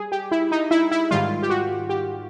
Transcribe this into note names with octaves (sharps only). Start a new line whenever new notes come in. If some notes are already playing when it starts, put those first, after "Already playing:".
Already playing: G3 G#4
G4
E4
D#4
E4
E4
G#2 D#3 G3 F4
G4
F#4
G4